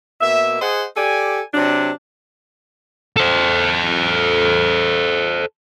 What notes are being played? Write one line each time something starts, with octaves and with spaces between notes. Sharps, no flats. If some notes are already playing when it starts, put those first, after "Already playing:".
B2 A#3 E5
G#4 C5 D#5 F#5
G4 A4 D5 G#5
C3 F#3 D4
A4 C5